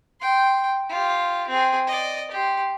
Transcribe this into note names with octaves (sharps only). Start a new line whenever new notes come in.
G5 C6
F4 G4
C4 G#4
D5 D#5
G4 C6